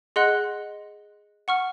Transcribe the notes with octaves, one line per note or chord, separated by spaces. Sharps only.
G#4 D#5 F#5 C6 F#6
F#5 C#6 F6